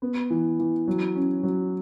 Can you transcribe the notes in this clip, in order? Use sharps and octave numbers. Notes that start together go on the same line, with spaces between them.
B3
E3
E3
F#3
C#4
F#3